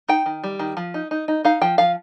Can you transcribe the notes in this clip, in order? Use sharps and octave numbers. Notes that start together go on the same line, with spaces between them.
D#4 G5
D#3
G3
D#3
F3
D#4
D#4
D#4
D#4 F5
F3 G5
F3 F5